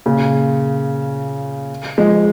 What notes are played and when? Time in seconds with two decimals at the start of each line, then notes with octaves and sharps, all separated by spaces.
0.06 A#2 C#3
1.98 F3 G#3